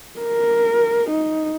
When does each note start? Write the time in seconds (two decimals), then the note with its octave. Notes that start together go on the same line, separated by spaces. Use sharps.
0.20 A#4
1.10 D#4